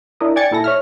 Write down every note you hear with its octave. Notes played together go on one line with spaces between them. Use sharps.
D4 E4 A#4 D#5
D5 G5 G#5 G#6 A6 C#7
A#2 E4 A4 A#6
C#5 E5 F6